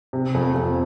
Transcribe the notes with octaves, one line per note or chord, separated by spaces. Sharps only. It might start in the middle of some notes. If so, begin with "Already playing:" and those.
C3
F2
F2